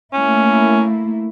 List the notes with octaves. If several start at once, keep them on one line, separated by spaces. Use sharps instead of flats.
A3 A#3 C#4 E4